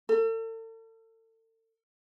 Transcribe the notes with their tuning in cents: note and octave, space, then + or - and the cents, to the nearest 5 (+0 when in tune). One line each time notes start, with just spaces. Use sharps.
A4 +40